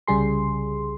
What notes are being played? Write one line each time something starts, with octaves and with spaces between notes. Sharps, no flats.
C2 C#3 G3 G#4 C6